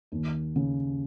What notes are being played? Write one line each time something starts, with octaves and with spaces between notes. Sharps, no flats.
D#2
C#3